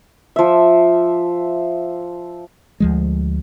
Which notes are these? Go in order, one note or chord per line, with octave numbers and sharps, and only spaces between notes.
F3 E5
D2 F3 G#3